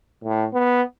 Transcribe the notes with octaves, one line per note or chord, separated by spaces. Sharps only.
A2
B3